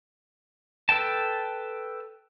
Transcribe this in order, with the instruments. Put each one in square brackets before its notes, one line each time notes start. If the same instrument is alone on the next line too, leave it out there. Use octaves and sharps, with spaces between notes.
[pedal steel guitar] A4 B4 G5 A5